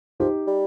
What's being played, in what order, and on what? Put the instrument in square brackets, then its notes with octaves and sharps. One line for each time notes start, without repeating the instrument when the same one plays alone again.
[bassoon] F3 [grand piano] D#4 G4
[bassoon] G3